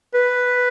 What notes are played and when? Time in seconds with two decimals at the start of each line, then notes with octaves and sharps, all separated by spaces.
0.14 B4